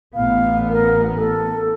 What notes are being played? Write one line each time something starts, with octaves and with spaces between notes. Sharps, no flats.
A1 B3 F5
A#4
A4